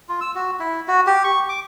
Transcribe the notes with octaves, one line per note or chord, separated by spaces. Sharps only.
F4
E6
F#4
E4
F#4
G4
C#6
D6